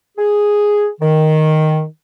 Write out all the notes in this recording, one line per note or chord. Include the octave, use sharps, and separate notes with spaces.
G#4
D#3